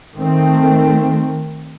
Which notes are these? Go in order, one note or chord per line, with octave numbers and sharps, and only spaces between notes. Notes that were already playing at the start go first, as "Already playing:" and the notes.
D#3 A3 C4